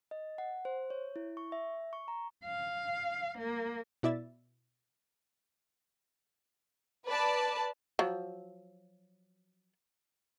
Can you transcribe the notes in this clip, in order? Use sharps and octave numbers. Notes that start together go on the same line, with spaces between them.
D#5
F#5
C5
C#5
E4
C#6
E5
C#6
A#5
F5
A#3
B2 E4 D5 E5 A6
B4 D5 A5
F3 F#3